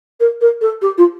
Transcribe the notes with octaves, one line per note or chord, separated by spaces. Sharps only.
A#4
A#4
A4
G4
F4